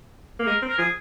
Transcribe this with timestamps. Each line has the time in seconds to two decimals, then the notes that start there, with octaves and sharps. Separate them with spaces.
0.40 A#3
0.47 G#3 A#4
0.62 C4
0.69 A#4
0.78 F3 G#4